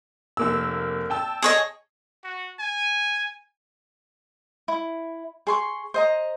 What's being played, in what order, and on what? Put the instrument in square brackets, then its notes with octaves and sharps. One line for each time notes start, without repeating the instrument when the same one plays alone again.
[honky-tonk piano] F1 A#3 E6
G5 A5 E6
[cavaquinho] G#4 C#5 D#5
[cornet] F#4
G#5
[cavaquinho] E4
G#4 C6 C#6
C5 D#5 A#5